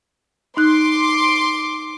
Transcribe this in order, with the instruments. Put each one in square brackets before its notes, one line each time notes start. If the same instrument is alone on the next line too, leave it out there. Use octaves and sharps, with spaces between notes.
[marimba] D#4 F#6 [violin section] C6 D6